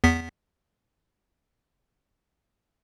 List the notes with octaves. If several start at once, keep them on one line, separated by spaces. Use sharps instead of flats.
E2 B3 B6